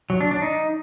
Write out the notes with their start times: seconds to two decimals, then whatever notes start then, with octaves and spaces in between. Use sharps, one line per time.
0.10 F#3
0.21 D4
0.31 D4
0.42 D#4